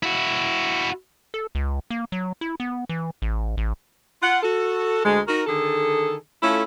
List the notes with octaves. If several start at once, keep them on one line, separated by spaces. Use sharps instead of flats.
E4 F#4
A4
C#2
A#3
F#3
E4
B3
E3
A1
A1
F4 F#5
F#4 A4
D2 G#3
D#4 F#4 A#4
D3 D#3 G#4 A4
A3 C#4 E4 F4 A4